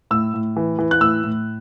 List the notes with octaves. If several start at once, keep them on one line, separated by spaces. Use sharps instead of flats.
A2 E6
A2
E3
E3
F#6
A2 E6
A2